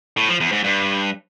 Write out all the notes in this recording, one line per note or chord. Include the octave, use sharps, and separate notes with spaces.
A2
F3
E2
G#2
G2